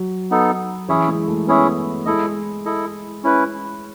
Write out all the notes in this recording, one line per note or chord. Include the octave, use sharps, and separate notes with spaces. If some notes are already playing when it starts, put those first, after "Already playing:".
Already playing: F#3
B3 D#4 A4
E3 C#4 E4 G#4 C#5 E5
G#3
A3
B3 C#4 E4 G#4 C#5 E5
G#3 E4 A4 D#5
E4 A4 D#5
C#4 E4 B4